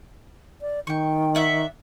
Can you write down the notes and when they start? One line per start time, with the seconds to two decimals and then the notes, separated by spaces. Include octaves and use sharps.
0.61 D5
0.87 D#3 G5 C#6
1.35 D5 E5 F#5